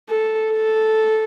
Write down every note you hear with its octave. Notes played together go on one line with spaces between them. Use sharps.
A4
A4